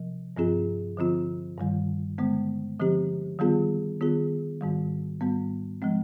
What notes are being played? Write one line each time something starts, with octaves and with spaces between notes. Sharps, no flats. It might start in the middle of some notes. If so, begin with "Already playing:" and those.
Already playing: C3 F3
G2 F3 C4 F4 G#4
D3 F3 C4 F4
G2 D#3 G3
D3 G#3 B3
D3 F3 C4 G4
D#3 G3 B3 F4 G#4
D#3 B3 F4 G#4
G#2 D#3 G3
G#2 G3 B3
F3 G#3 C4